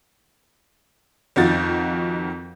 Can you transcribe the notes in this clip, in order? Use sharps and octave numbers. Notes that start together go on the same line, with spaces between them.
F2 D#3 F4 F#4 G6 A6